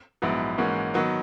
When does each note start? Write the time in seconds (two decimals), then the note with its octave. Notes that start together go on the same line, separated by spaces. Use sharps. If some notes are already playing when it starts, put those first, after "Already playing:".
0.22 A#1 G#2 F#3 B3 E4
0.58 G#2 E3 A#3 C#4 F#4
0.94 D#3 F#3 B3